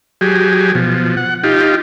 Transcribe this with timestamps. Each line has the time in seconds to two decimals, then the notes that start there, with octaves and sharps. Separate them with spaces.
0.21 F#3 G4 G#4
0.75 B2 F3
1.17 F#5
1.43 D#4 F4 G4